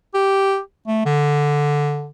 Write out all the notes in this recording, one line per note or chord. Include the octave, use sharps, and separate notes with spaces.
G4
A3
D3